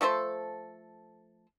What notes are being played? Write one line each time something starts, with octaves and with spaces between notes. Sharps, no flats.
F3 A3 A4 C5